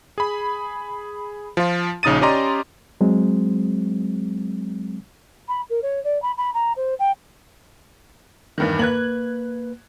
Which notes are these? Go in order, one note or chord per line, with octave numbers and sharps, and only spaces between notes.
G#4 B5
F3 F4
A#1 C#3 D#4 D#6 A6 D#7
C#4 G4 D5 D#5 A#5 C6
F#3 G#3 C4
B5
A#4
C#5
D5
B5
B5
A#5
C5
G5
E2 G2 D#3
A#3 B4 F#6 G#6 F#7